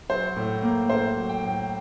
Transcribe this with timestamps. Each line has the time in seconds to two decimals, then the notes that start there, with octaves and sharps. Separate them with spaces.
0.09 F#3 C5
0.36 A2
0.63 A#3
0.90 A2 C5
1.16 F#3
1.29 G5
1.43 A2